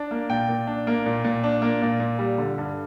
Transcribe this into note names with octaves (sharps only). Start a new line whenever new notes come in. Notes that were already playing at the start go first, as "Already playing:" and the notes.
Already playing: D4
A#3
A#2 G5
A#2
D4
A#3
A#2
A#2
D4
A#3
A#2
A#2
G3
D3
G2